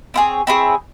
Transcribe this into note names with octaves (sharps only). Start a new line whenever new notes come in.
C4 E4 G#4 C#5
C4 E4 G#4 C#5